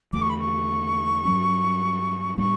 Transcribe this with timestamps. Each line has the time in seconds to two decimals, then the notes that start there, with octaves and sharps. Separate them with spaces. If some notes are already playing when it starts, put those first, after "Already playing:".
0.13 E2 D3 A3 D6
0.21 C#6
0.30 B5
0.39 C#6
1.25 G2 F#3 C#4
2.37 A2 G3 B3 D4 C#6